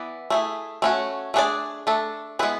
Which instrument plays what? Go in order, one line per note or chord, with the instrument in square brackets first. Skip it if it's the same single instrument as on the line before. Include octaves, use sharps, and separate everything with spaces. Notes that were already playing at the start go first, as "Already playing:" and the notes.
Already playing: [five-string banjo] E3 B3 E4 D5
A3 E4 G#4
A3 C#4 F#4
A3 D4 G#4 B4 D5
A3 D4 A4
G#3 B3 E4 G#4 B4